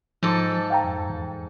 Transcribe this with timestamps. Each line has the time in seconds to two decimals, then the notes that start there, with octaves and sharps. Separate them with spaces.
0.23 G#2 F3 A4 D6
0.70 F5 G5 A#5
0.84 F2
1.10 E2